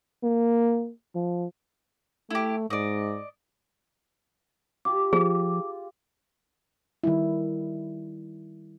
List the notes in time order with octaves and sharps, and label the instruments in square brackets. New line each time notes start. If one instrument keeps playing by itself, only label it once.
[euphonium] A#3
F3
[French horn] A3 [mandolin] E4 G4
[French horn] G#2 [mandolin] D5 D#5
[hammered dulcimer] F4 G4 [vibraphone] D6
[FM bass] F3 [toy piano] G#4
[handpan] D#3 G3 E4